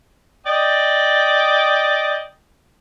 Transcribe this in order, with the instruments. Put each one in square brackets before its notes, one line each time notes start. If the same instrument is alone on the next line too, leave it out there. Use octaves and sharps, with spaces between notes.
[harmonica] D5 D#5 G5